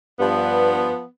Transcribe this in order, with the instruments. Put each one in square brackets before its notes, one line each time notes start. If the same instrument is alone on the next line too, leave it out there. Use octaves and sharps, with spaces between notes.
[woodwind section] G2 [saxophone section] F3 B3